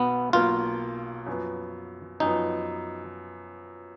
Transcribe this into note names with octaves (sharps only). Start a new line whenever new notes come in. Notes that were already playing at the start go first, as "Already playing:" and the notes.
Already playing: B1 B2 B3
B1 B2 A#3 F4
F#2 F3 B3
F#2 F3 B3 D#4